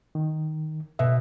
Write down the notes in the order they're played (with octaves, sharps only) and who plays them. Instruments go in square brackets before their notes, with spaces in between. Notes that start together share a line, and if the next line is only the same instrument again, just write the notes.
[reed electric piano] D#3
[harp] B2 [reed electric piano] E5